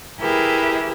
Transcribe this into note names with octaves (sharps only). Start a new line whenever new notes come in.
E4 G4 G#4 A#4 B4 E5